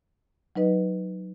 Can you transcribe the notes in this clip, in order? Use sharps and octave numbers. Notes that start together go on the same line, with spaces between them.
F#3 D#4 B4 D#5